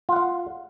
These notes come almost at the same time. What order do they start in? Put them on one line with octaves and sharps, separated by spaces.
F4 F#5 F5